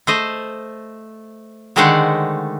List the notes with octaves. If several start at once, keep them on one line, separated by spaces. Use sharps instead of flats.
A3 C5 D#5
D3 D#3 G#3 A3 C5 F#5